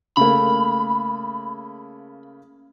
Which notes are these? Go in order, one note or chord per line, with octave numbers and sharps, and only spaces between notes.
C#3 A3 A#3 B5